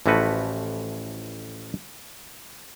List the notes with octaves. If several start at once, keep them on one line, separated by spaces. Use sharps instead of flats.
A1 E3 F3 A3 F#4 B4